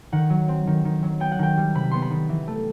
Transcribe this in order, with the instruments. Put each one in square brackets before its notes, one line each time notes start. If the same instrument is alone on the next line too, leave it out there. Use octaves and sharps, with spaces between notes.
[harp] D#3 F#5
F#3
C4
D#3
D#3
F#3
B3 G5
F#5
D#3 G5
G3
C3 B5
B3 C6
B5
D#3
E3
A3